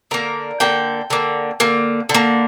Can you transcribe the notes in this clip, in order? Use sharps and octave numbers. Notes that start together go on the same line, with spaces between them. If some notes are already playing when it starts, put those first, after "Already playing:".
D3 A#3 A#4
D3 A#3 G5
D3 A#3
D3 A#3
D3
A#3